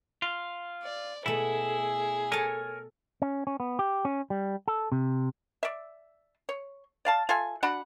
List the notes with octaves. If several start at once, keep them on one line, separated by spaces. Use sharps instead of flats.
F4
D5
B2 A3 E4 G#4
A4 A#4 C#5 G#5 A5
C#4
C#4
B3
G4
C#4
G3
A4
C3
D5 E5
C#5
D5 F5 A5
F4 A4 E5 G#5
D4 F#4 F#5 B5